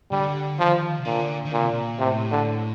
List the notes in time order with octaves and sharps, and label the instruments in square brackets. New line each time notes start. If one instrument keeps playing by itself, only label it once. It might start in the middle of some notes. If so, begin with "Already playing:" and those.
[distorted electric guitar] D3 [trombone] G3
[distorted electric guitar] D#3 [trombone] F3
[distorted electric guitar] C3
[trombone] A#2 [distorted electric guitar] D3
[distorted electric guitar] D#3
[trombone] A#2 [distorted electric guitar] D3
[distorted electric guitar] C3
A#2
[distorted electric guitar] A2 [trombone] C3
[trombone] D3